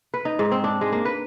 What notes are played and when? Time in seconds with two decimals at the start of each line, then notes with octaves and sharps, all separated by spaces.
0.14 B4
0.25 D#4
0.39 G#2
0.52 C4
0.64 D4
0.81 G#3
0.92 A#3
1.05 B4